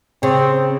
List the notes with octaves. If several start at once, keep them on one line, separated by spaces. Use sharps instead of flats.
C#3 C4